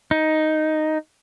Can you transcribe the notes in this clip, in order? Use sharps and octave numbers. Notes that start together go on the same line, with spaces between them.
D#4